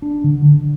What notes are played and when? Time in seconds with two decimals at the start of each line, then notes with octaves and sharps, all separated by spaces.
0.02 D4
0.24 D3
0.46 D3